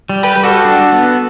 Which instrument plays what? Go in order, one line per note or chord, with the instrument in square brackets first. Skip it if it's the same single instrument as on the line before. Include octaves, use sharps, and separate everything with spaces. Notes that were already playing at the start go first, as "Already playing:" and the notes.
[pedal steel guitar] G3
[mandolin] G4 B4
[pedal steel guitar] G3 [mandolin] B4
[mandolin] F#4 A4
[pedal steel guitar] D4
B3